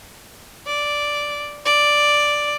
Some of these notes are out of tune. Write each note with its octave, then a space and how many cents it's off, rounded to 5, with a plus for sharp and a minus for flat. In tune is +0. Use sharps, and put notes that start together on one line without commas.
D5 -5
D5 +0